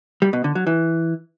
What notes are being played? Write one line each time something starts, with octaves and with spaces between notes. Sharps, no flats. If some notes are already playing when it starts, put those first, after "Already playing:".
G3
B2
D3
F#3
E3